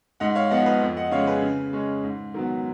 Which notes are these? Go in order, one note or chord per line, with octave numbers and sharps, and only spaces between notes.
G#2 D#5 F#5
C#5 F5
F3 B3 D#5 F#5
B4 D#5
F2
D#5 F#5
C#3 G#3 C#5 F5
G#4 B4
C#3
G#3 C#4
G#2
D#3 F#3 B3